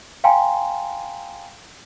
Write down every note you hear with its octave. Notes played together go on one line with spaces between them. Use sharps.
F5 G5 G#5 A#5 C6